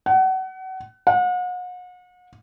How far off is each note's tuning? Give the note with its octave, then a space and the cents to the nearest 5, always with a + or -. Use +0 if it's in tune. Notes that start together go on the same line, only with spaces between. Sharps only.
F#5 +30
F#5 -40